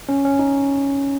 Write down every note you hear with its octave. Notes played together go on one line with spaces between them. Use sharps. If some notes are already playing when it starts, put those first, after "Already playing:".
C#4
C#4
D#4